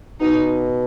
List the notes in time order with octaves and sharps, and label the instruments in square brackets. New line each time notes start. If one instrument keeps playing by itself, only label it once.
[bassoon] B2 [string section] D#4